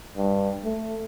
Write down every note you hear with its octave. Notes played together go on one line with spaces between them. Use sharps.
G2
A3